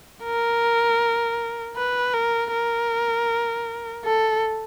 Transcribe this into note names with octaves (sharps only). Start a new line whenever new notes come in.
A#4
B4
A#4
A#4
A4